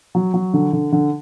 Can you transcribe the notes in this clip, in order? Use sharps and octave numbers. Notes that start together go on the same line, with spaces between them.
F#3
F#3
D3
D3
D3